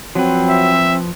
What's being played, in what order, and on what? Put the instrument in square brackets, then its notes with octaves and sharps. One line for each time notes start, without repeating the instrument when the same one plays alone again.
[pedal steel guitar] F3 B4 [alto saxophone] F#3 [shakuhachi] C4
[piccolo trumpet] E5